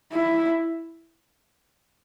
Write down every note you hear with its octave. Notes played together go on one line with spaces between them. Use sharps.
E4